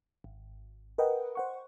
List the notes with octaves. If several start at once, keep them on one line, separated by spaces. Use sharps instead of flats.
G#1
A#4 B4 D#5 F#5 G5
C5 F#5 C#6